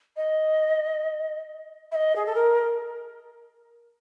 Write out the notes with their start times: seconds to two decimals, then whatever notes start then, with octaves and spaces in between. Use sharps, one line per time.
0.16 D#5
1.92 E5
1.95 D#5
2.16 G#4
2.26 A4
2.35 A#4